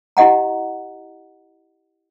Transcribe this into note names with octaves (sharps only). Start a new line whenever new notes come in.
E4 G4 D#5 F#5 A#5